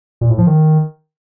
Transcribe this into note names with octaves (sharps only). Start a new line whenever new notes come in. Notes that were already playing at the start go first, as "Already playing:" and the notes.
A#2
A2
F3
D#3